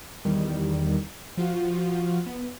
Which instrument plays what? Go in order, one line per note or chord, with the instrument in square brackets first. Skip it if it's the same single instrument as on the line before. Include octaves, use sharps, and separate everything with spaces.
[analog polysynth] E2 D#3 G3
F3 F4 F#4
B3